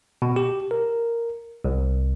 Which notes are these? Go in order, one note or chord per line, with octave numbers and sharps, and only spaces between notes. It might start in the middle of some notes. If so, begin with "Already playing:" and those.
B2
G4
A#4
C2